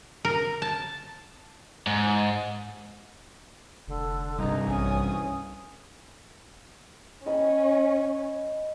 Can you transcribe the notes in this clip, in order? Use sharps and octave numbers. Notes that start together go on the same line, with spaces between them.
A#4
A5
G#2
F1 D3
C2 G2 D#4
A#1 C#4 G#5 D#6
C#4 D#5 B5